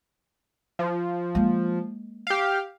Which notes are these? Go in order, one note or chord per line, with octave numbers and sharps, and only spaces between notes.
F3
G#3 A#3
G4 F5